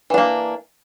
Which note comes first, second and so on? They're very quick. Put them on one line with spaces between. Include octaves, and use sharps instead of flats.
E3 D4 A#3